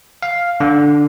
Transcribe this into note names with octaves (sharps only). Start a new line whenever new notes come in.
F5
D3